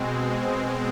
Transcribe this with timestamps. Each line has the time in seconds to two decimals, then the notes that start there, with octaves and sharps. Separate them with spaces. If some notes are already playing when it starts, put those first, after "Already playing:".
Already playing: B2 G#3 C4
0.29 G#5